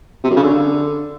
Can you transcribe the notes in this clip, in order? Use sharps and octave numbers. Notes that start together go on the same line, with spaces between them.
C3
F#2
C#3
D3